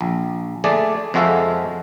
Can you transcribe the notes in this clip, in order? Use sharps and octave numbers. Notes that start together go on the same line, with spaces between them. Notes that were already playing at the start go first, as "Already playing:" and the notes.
A#1
A3 G#4 D5 A5
F2 G#3 F#4 A4 E5 F5